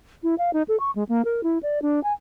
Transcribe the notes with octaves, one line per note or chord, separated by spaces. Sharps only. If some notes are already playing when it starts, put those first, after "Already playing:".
E4
F5
D#4
A4
C#6
G#3
A#3
A#4
E4
D5
D4
G#5